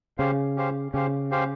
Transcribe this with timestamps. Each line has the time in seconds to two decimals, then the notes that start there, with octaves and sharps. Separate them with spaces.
0.18 C#3 C#4 G4 C5 F5
0.57 C#4 G4 C5 F5
0.93 C#3 C#4 G4 C5 F5
1.31 C#4 G4 C5 F5